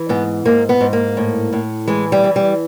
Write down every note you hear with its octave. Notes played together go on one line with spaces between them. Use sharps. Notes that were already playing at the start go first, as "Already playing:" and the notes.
Already playing: E3
G#2 B3
G#2 A#3
B3
G#2
A#3
A2
A2
E3 G#3
G3
E3
G3